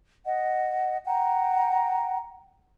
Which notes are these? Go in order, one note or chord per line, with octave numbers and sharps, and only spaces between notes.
D#5 F#5
F#5 G5 A#5